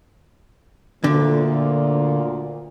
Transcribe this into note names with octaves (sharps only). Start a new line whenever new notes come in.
D2 A#2 D3